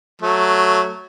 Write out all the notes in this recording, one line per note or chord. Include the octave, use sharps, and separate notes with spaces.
F#3 A3